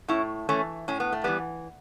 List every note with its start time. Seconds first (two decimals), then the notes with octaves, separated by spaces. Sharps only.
0.08 A2 C#4 E4
0.49 E3 A3 C#4
0.88 A2 C#4
1.00 B3
1.12 A3
1.24 E3 G3 B3